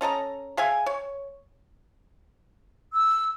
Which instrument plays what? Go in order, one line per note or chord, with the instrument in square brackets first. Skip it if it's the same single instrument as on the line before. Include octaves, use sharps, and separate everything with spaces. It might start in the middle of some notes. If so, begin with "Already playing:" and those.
[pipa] C#4 A4 D#5 A#5
G#4 E5 F5 G#5
C#5
[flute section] E6